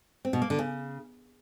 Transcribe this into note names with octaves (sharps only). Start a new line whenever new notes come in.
C4
B2
A#3
D3
C#3